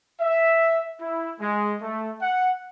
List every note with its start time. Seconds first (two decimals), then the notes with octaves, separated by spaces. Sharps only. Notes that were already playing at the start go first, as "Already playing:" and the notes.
0.20 E5
1.00 E4
1.40 G#3
1.82 A3
2.21 F#5